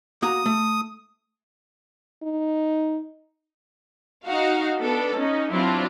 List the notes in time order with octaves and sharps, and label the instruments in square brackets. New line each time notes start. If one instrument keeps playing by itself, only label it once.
[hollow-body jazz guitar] A#3 F#4 A#5 [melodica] D#6
[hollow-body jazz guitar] A3
[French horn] D#4
[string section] D#4 F#4 F5
B3 D4 A4
C#4 D#4
F#3 C4 D4 E4 F4